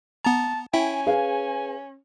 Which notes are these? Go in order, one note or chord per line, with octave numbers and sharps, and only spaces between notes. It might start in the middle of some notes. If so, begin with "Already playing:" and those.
B3 A5 A#5
C#4 E4 E5 G5 G#5
G#4 B4 F5